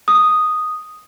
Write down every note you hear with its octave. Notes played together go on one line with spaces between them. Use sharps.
D#6